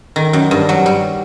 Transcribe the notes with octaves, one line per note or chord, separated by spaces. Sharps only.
D#3
F#2
G2
F#3
G3